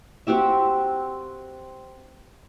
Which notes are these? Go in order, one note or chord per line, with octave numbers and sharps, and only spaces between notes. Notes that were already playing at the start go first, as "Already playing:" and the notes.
C4 F#4 G4 E5